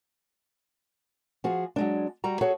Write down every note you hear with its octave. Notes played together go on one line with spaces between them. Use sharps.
F3 F#4 G#4
F#3 G#3 D4
G3 F#4 A#5
F#4 G#4 A4 C#5